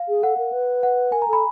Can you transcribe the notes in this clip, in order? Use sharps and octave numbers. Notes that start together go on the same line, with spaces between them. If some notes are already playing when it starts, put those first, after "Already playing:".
Already playing: F5
G#4
A4 F#5
A#4
B4
F#5
A#4 G#5
A#5
A4
B5